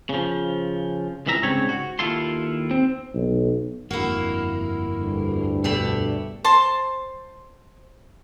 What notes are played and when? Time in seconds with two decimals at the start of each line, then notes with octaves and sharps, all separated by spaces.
0.09 C#3 F3
1.26 C#2 E3 G3 E5 A#5
1.43 G#2 C#3 G3 C4 C#5
1.69 F#4
1.99 D#2 E4 F4 A4 C6
2.71 C4
3.14 B1
3.91 G1 F2 A#3 D4 E4 F#4
4.99 D2 G2
5.64 B2 G4 A4 D5 E5
6.44 C5 A5 C6